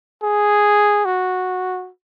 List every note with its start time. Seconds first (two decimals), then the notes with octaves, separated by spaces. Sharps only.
0.23 G#4
1.05 F#4